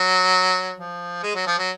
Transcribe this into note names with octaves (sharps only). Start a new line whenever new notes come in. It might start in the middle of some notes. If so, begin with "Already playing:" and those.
Already playing: F#3
F3
G#3
F#3
F3
F#3